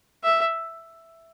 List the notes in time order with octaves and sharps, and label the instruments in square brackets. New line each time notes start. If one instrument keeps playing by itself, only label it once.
[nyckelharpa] E5